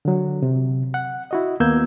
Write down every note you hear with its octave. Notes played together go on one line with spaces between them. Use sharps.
D3 F#3
C3
F#5
E4 F#4 D#5
D#2 A#3 B3 E6 G6 G#6